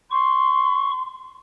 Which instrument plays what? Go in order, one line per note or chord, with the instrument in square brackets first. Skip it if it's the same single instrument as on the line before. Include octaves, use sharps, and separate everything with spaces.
[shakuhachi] C6 [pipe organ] C#6